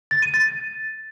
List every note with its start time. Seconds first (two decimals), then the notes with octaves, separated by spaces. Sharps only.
0.11 A6
0.22 D#7
0.34 A6